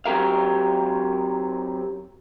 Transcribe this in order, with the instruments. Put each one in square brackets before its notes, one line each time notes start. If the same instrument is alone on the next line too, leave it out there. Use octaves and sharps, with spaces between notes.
[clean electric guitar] F#3 C4 G4 A#4 F5